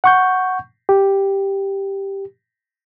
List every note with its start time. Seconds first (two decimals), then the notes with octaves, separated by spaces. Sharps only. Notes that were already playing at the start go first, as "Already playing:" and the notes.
0.04 F#5 C#6 G6
0.89 G4